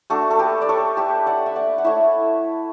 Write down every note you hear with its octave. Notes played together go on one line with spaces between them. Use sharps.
A3 D4 F#4 A4
A4
G4 B4
D5
A4 C#5
G4 B4
D5 F#5
E5
D5 F#5
F#5
A3 E4 C#5 E5